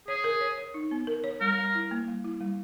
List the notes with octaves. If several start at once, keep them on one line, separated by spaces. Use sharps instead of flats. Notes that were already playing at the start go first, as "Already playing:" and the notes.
G#4 C#5
A#4
C#5
C#5
D#4
B3
A#4
C#5
G3 A#4
G3
E4
A#3
G3
E4
G3